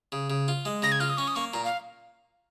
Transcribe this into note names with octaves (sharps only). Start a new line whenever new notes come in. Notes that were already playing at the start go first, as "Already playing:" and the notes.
C#3
C#3
F4
G#3
C#3 A#6
G#6
F4 F6
D#6
C#4 C#6
D#6
A#3 C#6
A#2 A#5
F5